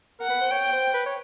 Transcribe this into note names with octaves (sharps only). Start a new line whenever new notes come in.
A#4 F#5
B4
C5
C#5 G5
C5
B4
C#5